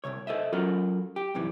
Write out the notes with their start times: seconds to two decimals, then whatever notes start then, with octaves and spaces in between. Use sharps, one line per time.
0.04 C2 G#2 C3 C#5
0.27 A4 C5 D#5 E5
0.53 F#3 C#4 F4 F#4 A4 A#4
1.16 G4
1.34 F#2 C3 E3 G3